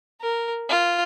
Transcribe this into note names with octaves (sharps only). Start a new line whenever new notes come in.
A#4
F4